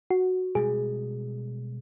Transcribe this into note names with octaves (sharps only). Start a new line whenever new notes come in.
F#4
B2 G3 G#3 G#4